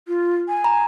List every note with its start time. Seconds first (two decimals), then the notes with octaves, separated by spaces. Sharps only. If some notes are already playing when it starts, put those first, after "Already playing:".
0.08 F4
0.49 G#5
0.64 A#5